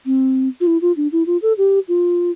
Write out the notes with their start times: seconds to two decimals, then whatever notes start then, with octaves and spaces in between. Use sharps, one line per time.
0.06 C4
0.61 F4
0.67 E4
0.82 F4
0.97 D4
1.12 E4
1.27 F4
1.42 A4
1.58 G4
1.88 F4